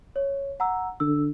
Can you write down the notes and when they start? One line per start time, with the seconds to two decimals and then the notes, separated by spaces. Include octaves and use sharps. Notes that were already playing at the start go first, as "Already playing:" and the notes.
0.16 C#5
0.60 F#5 A#5 E6
1.00 D3 E6